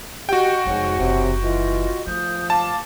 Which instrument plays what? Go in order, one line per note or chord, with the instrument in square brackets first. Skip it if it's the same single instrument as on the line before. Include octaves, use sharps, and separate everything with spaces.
[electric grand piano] F#4 G5 [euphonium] G4 [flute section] D#5 F#5
[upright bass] F1 F2 [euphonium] G#2 [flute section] C#5 F#5 G#5
[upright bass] F#1 [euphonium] C3
[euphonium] E3 [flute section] F4 D#5
[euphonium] F3 [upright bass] A3 [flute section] D#6 G6
[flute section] F5 D6 [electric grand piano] A5